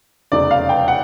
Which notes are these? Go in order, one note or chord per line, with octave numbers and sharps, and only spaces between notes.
F1 E2 C#3 D5
F5
G5
F#5